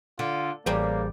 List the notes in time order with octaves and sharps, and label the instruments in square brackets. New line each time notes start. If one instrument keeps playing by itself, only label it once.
[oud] D3 [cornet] F4
[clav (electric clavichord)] A1 A#5 [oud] G3 G#4 C5 [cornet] A#3